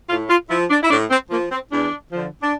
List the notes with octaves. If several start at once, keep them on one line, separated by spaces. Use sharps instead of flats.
A2 F4
F4
F3 E4
D4
E4
A2 D4
C4
F3 A#3
C4
E2 D4
D3 F3
D4